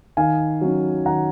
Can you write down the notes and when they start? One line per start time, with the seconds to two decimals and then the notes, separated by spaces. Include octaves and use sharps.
0.17 D#3 F5 G#5
0.61 F#3 C#4
1.06 D#3 F#5 A#5